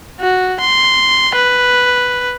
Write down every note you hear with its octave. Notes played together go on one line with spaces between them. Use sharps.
F#4
C6
B4